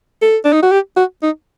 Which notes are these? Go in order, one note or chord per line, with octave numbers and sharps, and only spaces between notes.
A4
D4
D#4
F#4
G4
F#4
D#4